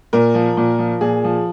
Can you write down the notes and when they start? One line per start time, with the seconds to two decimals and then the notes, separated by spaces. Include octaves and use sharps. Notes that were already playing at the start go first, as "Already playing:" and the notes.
0.13 A#2 A#4
0.35 F3
0.57 A#2
0.79 F3
1.01 A#2 G#4
1.24 F3